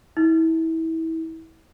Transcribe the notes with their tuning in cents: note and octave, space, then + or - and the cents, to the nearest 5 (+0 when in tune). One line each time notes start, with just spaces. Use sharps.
E4 -30